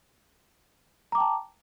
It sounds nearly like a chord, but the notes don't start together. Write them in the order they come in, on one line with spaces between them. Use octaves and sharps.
A#5 D6 G5 A5